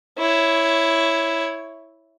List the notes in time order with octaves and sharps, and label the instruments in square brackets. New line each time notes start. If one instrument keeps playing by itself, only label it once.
[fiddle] E4 C#5